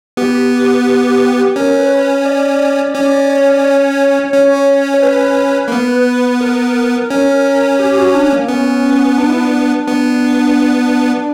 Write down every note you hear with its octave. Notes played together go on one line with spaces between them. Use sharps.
B3 G4
C#4 A#4
B4
C#5
B4
D5
C#4 D5
D5
C#5
D5
C#5
C#4
C#5
B4
A#3
B3
A#4
C#4
G4
F#4
D4
A#3
B3 C#4
D4
E4
D4
B3